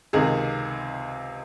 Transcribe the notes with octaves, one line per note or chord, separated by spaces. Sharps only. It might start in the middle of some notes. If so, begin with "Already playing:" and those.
C#2 C3 D#3 G#4